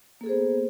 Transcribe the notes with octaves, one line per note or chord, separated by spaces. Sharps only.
A#3 B3 G#4 A4 C5